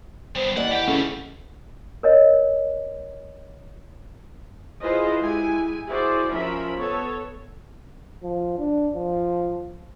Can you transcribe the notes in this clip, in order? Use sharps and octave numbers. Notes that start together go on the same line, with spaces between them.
G3 B3 C5
D#2 E3 D5 F#5
G4 F#5 G5
C#3 G3 A3 C#4
A#4 C#5 D#5
E4 F4 G#4 B4 C5 D#5
G#3 E4 G4 G#5
E4 F#4 G#4 C5 D5
F3 C#4 A#4 E5 B5
B3 A4 C#5
F3
D4
F3